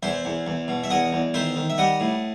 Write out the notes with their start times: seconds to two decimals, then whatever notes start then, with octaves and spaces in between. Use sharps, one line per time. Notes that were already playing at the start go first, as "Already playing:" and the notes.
0.03 E2 C5 E5
0.25 E2
0.47 E2
0.68 B2
0.84 E5
0.90 E2 D#5 F#5
1.13 E2
1.34 D#3 C5 E5
1.56 D#3
1.70 E5
1.78 G3 D#5 F#5
2.00 A2